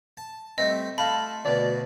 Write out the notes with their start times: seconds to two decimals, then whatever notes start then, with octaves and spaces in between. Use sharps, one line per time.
0.17 A5
0.58 G3 A3 C4 D#5
0.98 A3 F4 A5 B5
1.45 D2 B2 D5